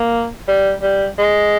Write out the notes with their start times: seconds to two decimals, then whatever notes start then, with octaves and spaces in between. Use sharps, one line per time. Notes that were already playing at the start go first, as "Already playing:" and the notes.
Already playing: A#3
0.48 G3
0.82 G3
1.18 G#3